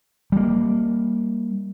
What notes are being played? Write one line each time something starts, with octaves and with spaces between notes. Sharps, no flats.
G3 A#3